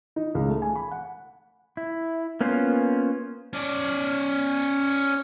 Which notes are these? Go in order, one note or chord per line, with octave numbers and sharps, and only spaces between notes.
D#4
C#2
A3
G#5
B5
F#5
E4
A#3 B3 C#4 F4 C5
C#4 D5